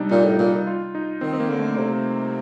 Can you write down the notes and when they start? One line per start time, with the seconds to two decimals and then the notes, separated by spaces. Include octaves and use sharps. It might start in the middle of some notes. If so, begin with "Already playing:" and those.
Already playing: C3 G3 D4 D#4
0.11 A#2 D#4
0.25 A2
0.39 A#2
0.67 F4
0.95 D#4
1.21 D#3 C4
1.33 C4
1.40 A#3
1.50 D3
1.59 A3
1.77 C3